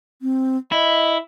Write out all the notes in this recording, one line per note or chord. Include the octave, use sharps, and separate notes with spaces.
C4
E4 D#5